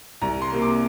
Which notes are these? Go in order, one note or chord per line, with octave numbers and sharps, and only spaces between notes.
C2 A#5
C6
C3 A#3
D6